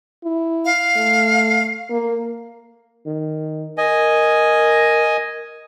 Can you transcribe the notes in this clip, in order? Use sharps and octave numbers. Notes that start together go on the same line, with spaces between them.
E4
F5
A3
A#3
D#3
A#4 D#5 G#5